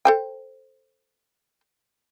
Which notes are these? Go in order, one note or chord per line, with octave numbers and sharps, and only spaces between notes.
A4 C5 G5